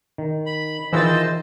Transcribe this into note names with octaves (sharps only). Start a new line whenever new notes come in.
D#3
B5
D#3 E3 F4 G#4 C5 D#5 E6 A6